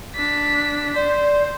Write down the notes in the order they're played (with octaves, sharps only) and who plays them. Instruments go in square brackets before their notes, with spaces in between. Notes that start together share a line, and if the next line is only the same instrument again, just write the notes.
[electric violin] D4 B6
[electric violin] C5 [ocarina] D5